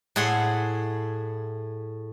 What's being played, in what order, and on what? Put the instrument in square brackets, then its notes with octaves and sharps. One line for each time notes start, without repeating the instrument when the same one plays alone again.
[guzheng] A2 E4 G#4 F#5 C6